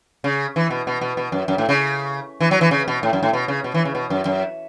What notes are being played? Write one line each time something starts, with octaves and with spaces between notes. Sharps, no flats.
C#3
E3
B2
B2
B2
B2
F#2
F#2
A2
C#3
E3
F#3
E3
C#3
B2
A2
F#2
A2
B2
C#3
B2
E3
C#3
B2
F#2
F#2